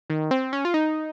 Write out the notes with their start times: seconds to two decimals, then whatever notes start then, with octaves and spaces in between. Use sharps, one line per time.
0.10 D#3
0.31 C4
0.53 C#4
0.65 F4
0.74 D#4